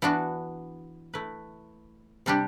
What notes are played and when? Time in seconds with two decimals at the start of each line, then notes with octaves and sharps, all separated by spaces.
0.02 E3 B3 D4 F#4
1.14 A3 E4 B4
2.26 C3 G3 D4 G4